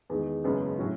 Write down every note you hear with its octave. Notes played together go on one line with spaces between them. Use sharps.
E2 D#3 G#3
F#1 F#2 C#3 G#3 B3
A2 F#3 C#4 F#4